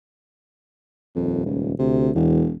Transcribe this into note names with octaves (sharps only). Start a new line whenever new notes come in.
D#1 F2
C#2
D2 C3
E1 E2